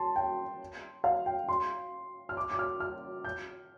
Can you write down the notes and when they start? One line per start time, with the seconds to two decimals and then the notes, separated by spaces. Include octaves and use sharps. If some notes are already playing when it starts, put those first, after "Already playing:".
Already playing: A5 C6
0.16 G5
1.04 F5
1.26 G5
1.49 C6
2.29 F6
2.37 D6
2.52 D6
2.59 F6
2.80 F6
3.25 G6